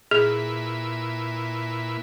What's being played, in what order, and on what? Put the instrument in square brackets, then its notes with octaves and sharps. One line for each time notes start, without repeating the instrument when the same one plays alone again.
[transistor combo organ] A#2 E4 B4 [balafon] G#4